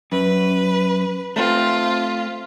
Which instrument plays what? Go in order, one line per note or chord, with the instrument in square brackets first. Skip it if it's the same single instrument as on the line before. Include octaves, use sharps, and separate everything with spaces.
[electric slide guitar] F#2 [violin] B4
[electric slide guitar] A3 C4 [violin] F4